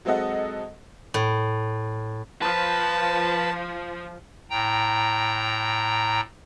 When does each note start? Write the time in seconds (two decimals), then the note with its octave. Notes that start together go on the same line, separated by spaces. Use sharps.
0.05 F#3 G#3 C4 A4 D#5 F#5
1.14 A2
2.42 F3 B4 A5
4.50 A2 G5 A#5